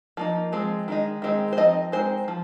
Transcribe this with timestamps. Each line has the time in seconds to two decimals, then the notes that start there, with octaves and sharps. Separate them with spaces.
0.17 F3 A#3 D#4
0.52 F3 G#3 C4
0.88 D#3 G#3 D#4
1.22 D#3 G#3 C4 D#4
1.53 C5
1.57 F3 C4 D#4 D#5
1.92 G#3 C4 D#4 C5
2.28 F3